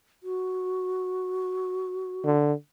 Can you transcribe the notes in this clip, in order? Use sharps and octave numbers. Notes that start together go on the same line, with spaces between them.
F#4
D3